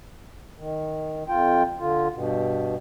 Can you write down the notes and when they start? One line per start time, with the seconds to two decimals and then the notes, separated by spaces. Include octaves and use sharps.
0.58 D#3
1.28 F2 F4 G5
1.79 D3 F4
2.13 G2 B2